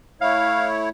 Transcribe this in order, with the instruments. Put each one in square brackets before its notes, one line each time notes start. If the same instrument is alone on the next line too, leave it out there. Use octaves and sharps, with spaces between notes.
[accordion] A3 E4 C#5 [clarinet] F5